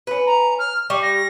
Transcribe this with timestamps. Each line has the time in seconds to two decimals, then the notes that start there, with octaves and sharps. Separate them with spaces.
0.07 C#4 B4
0.27 A#5
0.59 F6
0.90 G3 C#6
1.03 A#6